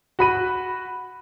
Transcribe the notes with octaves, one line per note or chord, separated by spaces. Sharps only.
F#4 B5 D#7